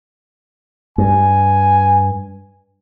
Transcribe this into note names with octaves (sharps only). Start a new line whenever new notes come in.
G2 G#5